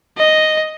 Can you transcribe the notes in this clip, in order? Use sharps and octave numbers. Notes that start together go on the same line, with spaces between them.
D#5